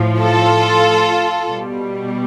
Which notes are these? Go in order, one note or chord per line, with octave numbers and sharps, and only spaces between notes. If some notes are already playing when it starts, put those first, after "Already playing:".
Already playing: A2 F3
F4 A4
B2 G3